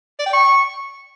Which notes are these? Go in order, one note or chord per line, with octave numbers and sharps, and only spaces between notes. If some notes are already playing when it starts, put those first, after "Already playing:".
D5
G5
C#6